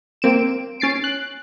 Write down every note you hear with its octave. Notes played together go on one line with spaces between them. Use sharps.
A#3 C4 D7 E7
C#4 A6 C7 D7
F#6